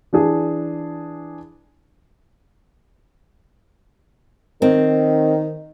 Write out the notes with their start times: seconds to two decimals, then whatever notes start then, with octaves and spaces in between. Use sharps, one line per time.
0.13 E3 D4 G#4
4.62 D#3 C4